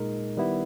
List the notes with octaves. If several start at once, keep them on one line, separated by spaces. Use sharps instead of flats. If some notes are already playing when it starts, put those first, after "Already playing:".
Already playing: A#2 G#3 D#4 A#4
D#3 G3 B3 E4